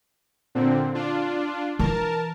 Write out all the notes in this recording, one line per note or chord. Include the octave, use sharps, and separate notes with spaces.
A#2 D3 C4
D4 F4
E3 A#4 A5